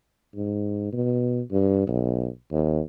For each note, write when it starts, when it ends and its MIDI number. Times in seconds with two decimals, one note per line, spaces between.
0.36 0.91 44
0.92 1.41 47
1.52 1.85 43
1.87 2.27 35
2.52 2.80 39